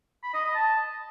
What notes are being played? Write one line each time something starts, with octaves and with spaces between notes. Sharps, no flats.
B5
D#5
D#5
A5